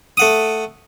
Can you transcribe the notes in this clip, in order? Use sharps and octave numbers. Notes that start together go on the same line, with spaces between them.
A3 F#5 D#6